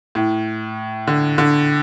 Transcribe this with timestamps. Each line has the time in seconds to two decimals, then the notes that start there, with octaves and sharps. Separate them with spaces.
0.15 A2
1.07 D3
1.38 D3